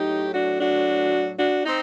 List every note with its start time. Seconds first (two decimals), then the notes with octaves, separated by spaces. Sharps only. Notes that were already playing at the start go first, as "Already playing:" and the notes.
Already playing: A2 F#3 D#4 G4
0.33 D4 F#4
0.60 D4 F#4
1.39 D4 F#4
1.66 C4 D#4